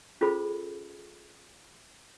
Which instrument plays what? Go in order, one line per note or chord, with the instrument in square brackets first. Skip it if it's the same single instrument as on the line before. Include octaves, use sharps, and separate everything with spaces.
[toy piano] C#4 F4 G#4 A4 C5 B5